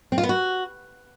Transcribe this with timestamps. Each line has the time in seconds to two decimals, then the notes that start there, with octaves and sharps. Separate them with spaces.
0.12 C4
0.18 F4
0.23 B3
0.29 F#4